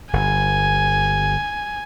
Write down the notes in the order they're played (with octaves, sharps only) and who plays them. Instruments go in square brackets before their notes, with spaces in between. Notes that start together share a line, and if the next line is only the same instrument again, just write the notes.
[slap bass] G1 [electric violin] G#5